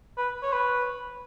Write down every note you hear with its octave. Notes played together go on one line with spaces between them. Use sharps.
B4
C#5
B4